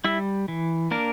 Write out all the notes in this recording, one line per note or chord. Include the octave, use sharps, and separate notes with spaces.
G3 E4 E5
E3
A#3 D4 A#4